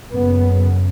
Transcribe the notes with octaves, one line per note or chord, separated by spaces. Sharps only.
F#1 F#2 C#3 B3